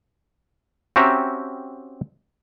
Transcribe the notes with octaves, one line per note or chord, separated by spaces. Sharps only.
C4 C#4 F#4 G4 E5 A#5